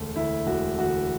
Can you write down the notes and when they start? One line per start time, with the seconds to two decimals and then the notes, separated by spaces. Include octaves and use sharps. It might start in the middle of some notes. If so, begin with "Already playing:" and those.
Already playing: E1 D2 A3
0.15 D2 E4
0.47 E1 F#4
0.78 D2 F#4